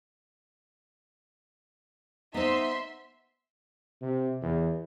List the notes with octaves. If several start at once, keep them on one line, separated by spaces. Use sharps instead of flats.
B3 D#4 C5 E5 C6
C3
E2